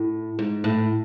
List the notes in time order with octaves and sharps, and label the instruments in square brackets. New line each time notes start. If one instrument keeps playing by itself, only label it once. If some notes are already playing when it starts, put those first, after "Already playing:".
Already playing: [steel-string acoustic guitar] A2
G#2
A2